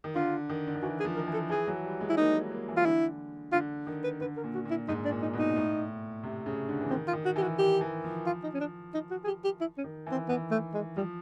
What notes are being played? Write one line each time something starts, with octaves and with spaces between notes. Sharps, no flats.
D#3
D3 F4
D#3
D3
D#3
E3 F#4
G#4
F3
D#3 A#4
E3
A4
E3 G#4
F#3
G3
G#3
E4
A#3 D#4
A#3
A#3
E3
F4
D3 E4
D3 F4
D#3
B4
D3 B4
A#4
A#2
F#4
A#2
E4
G#2 D#4
D4
A#2
D#4
B2
D#4
A2
C3
C#3
D3
E3
D#3 C4
F4
D#3
F#4
E3 G4
F#4
D#3 G4
E3
F3
F4
D#4
C#4
D4
D#4
F#4
G#4
G4
G4
E4
C#4
D#3
E3
C4
E3 B3
A3
G#3
F3 G3